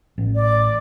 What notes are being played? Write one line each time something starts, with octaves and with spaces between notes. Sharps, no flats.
A1
D5